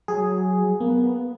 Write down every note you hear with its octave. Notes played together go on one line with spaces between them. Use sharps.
F#3 G#4
A#3 B3